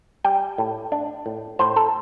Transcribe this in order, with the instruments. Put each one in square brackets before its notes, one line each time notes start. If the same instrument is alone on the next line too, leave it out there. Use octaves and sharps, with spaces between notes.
[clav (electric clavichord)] G3 G5
A2
D4
A2
A2 C5
A4